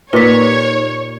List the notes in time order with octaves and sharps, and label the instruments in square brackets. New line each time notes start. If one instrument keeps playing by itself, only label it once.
[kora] A#2 [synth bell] A#3 D#4 G4 [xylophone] B4 D6 B6 [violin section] C#5